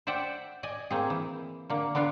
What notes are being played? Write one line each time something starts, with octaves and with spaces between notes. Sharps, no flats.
C5 D5 E5 F#5 G5
D5 D#5 G#5
A#3 C4 G#4
E3
D3 A#3
D3 B3 D4 F4 F5